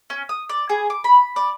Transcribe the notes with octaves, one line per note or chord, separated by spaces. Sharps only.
C#4
D#6
D5
G#4
D6
B5
D5